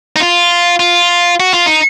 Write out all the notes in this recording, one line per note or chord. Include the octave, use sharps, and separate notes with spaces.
D#4
F4
F4
F#4
F4
D#4